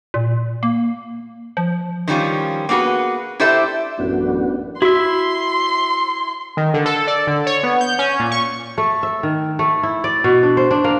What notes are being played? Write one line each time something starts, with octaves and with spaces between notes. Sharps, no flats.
A#2
A#3
F3
D#3 F3 G3 C#4 F4
A#3 B3 F#4 G#4 B4
E4 G4 A4 C5 D5 E5
A1 F#2 B3 D4 F#4
E4 F#4 E5 C6
D#3
D3
A4
D5
D3
C#5
B3
G6
C#4
A#2
C#6
A3
E5
D#3
A3
E4
D5
B2
D4
C5
D4
A#3